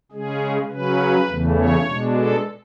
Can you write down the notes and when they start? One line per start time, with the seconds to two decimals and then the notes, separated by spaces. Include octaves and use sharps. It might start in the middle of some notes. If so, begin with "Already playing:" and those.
0.12 C#3 G#3 C#4 G#4
0.69 C#3 F#3 C#4 B4
1.28 E2 C#3 E3 A3
1.57 C#5
1.86 B2 G#3 D4
2.15 A4